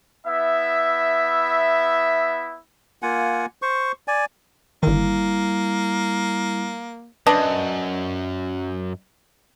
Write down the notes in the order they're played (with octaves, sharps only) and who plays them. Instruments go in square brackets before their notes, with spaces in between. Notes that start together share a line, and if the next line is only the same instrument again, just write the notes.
[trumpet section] B3 E4 E5
[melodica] A#3 F4 F#5 G#5
C5 C#6
D5 G#5
[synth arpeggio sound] G1 D#3 [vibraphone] G3 E4 [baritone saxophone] A#3
[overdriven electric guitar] F#2 [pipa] D4 B4 D#5